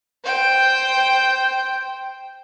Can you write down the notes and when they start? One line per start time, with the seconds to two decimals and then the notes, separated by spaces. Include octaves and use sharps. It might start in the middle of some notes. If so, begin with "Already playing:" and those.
0.24 C5 G5